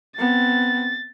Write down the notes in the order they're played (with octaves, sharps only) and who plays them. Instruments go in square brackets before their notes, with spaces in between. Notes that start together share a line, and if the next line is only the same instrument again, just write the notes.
[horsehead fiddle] B3 C4 [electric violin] A6